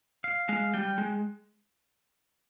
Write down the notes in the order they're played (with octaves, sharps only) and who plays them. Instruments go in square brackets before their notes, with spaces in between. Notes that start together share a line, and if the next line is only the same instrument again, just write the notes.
[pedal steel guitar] F5
[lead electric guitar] G#3 [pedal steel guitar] F5
[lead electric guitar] G3 [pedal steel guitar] G5
[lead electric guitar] G#3